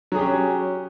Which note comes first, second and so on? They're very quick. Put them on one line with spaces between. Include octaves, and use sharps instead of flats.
F#3 G#4 G4 C#4